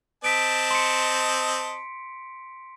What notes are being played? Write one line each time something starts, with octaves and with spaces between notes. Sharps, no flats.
C4 D#5 A5 B6 D7
C6 C#7